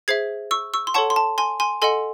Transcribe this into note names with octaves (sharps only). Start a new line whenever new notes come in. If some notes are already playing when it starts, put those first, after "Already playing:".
G#4 C5 E5 G#6 C7
C#6 E6
C#6 E6
C6
A4 C#5 F#5 A5 C#6
C6
A5
G#5 C6
G#5 C6
A4 D#5 F#5 G#5 C6